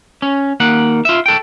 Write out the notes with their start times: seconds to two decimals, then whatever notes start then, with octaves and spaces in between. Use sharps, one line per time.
0.22 C#4
0.60 D#2 A#3 F#5
1.05 F4 E5
1.26 A4 G5